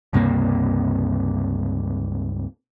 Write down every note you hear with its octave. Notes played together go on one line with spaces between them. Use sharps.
C#2 G2 C3 A#3